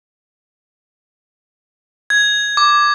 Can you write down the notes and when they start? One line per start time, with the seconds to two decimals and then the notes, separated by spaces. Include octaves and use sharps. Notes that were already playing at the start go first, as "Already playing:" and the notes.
2.10 G#6
2.57 D6